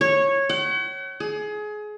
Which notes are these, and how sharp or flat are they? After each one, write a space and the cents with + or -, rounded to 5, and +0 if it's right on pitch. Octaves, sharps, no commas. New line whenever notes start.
C#5 -10
F#5 +45
G#4 +25